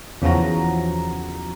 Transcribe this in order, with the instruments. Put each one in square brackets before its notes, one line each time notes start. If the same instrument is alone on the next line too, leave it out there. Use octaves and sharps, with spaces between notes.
[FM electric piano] E2 C#3 E3 F3 F#4 A#5